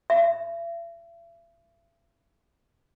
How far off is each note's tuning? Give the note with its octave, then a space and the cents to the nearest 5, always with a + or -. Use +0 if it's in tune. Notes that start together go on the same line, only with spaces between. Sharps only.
E5 +40